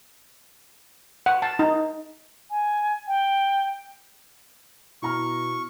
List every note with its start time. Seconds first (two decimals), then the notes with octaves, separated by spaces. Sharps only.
1.26 F#5
1.42 A5
1.59 D#4
2.50 G#5
3.08 G5
5.03 B2 E4 A#5 C#6 F6